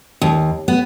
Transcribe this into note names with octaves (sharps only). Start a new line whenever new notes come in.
D#2
B3